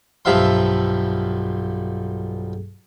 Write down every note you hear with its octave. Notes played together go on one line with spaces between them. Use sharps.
B1 G2 F3 E5 F5 C6